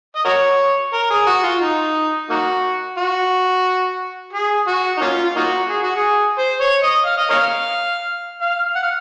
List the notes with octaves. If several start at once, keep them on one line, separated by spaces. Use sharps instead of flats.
D#5
F#4 A#4 C#5
A#4
G#4
F#4
F4
D#4
A#3 D#4 F#4
F#4
G#4
F#4
D#4
A#3 C#4 F4
F4
A#3 D#4 F#4
G#4
F#4
G#4
C5
C#5
D#5
F5
D#5
A#4 C#5 F5
F5
F#5
F5